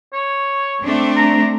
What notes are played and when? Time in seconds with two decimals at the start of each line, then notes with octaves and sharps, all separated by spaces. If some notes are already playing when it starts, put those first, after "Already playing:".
0.13 C#5
0.84 A3 C4 D4
1.16 A#5